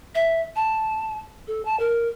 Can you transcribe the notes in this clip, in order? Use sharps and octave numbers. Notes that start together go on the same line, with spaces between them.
E5
A5
A4
A5
A#4